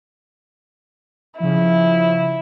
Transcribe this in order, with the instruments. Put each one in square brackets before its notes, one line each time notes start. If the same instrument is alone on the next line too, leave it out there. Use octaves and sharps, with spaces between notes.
[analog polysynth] C#3 F3 [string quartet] E4